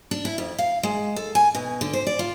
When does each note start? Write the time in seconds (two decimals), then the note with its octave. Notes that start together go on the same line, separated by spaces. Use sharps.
0.11 D4
0.25 E4
0.38 F2
0.58 F5
0.83 G#3
1.16 A4
1.35 G#5
1.55 B2
1.81 D3
1.93 C5
2.07 D5
2.19 F4